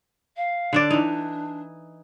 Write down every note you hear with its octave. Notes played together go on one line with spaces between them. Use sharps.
F5
D3 D4 D5
E3 D4 D#4